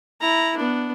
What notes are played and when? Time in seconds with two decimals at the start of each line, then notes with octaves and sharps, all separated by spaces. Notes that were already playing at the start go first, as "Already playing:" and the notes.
0.21 E4 A#5
0.57 B3 D4